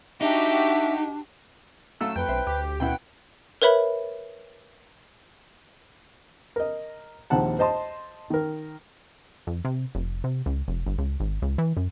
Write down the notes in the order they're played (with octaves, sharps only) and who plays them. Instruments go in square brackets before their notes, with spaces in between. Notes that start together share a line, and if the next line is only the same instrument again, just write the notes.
[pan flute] D4 [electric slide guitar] D#4 [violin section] F#4 G4 [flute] E5
[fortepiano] F#3 A3 [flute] F5 [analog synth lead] E6
[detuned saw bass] F2 [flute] B4 [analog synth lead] G5
[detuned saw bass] B1 [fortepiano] C5 E5
[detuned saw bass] D2 [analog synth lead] G4
[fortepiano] C2 B2 E4 [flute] F#5 [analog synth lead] G5
[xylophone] A#4 B4 C#5 E5 B5
[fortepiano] A#4 D#5
A#1 D#2 C4 F#5 A5
C5 D#5 A5 C6
D#3 A#4
[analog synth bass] F2
C3
F1
C3
C#2
F1
G1
C#2
G#1
C#2
E3
F#2